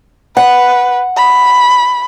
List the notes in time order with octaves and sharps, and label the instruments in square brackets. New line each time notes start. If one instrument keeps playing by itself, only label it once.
[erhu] B4 [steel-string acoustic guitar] F#5
[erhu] B5